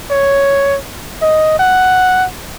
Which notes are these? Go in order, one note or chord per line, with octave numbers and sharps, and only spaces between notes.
C#5
D#5
F#5